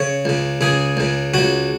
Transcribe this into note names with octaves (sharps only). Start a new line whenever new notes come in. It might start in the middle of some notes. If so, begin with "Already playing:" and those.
Already playing: C#3 C#5
C#2 C#3
C#2 C#3 G#4
C#2 C#3
C#2 C#3 F#4